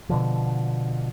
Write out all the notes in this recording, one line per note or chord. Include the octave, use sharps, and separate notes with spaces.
B2 D3 F3